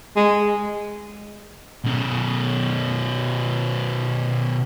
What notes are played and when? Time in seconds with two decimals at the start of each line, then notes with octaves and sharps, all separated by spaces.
0.16 G#3
1.84 B2 C#4